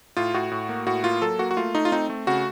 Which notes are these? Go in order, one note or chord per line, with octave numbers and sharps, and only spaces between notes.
A2 F4
A2 F#4
A2
A#3
A2 F#4
A#3 F4
F#3 A4
A#3 F#4
F#4
A3 F4
A3 D#4
F4
C4 D#4
A3
C#3 F#4